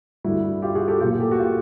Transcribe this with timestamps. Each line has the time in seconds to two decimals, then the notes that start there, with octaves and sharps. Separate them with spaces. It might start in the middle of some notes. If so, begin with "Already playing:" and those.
0.24 G2 D3 G3 E4 F#4
0.62 F4 G4
0.75 F#4 G#4
0.88 G4 A4
1.01 A#2 F#3 F4 G4
1.20 G4 A4
1.31 F#4
1.39 F4 G4